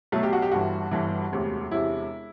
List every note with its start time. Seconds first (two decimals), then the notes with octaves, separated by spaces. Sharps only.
0.12 B1 B2 F#3 A3
0.23 G4
0.33 F#4
0.42 G4
0.51 G1 G2 E3 F#4
0.91 G1 G2 E3
1.32 E1 D2 C3
1.71 E1 C3 E4